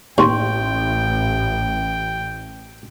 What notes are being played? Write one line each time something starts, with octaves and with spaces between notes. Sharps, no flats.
A1 D#2 G5 C6 C#6